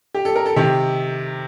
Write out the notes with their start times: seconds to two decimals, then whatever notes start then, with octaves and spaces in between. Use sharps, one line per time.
0.14 G4
0.25 A4
0.35 A#4
0.46 A4
0.56 C3 D#3 G4